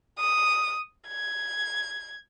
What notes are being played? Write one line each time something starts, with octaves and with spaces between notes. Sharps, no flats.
D#6
G#6